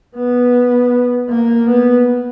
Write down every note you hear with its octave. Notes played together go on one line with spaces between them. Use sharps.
B3
A#3
B3